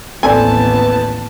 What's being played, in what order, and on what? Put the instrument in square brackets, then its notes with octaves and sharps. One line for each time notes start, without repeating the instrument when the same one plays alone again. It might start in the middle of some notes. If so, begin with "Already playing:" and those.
[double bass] A1 D#2 [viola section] B3 A5 [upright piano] C4 A4 D5 [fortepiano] G#5